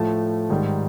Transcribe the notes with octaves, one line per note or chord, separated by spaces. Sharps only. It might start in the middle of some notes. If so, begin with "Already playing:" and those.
Already playing: A2 F3 A3 A5
G#2 D#3 G3